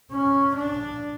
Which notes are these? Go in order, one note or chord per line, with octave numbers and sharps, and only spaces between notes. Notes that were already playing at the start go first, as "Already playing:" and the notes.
C#4
D4